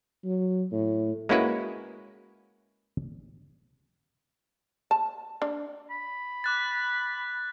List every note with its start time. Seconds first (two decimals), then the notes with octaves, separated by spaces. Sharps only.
0.24 F#3
0.72 A2
1.29 G#3 A#3 C#4 E4 F#4 B4
4.91 A5
5.42 D4
5.90 B5
6.44 D6 F#6 A6